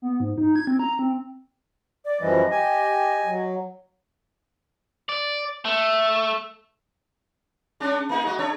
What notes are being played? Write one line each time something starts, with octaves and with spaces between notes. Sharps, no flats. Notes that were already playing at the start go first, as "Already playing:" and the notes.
B3
G#2
D#4
G#6
C4
A#5
C4
D5
F#2 E3 F3 G3 D#5
G4 G#5
F#3
D5
A3
G#3 C#4 D4
A#3 D#4 G#4
G#3 F#4 D#5
D4 A4 C#5